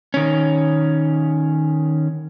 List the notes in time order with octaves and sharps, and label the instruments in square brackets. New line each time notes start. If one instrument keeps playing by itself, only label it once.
[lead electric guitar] D#3 C#4